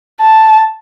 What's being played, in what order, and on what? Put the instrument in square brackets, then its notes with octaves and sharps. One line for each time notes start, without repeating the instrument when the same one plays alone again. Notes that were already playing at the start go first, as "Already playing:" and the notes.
[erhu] A5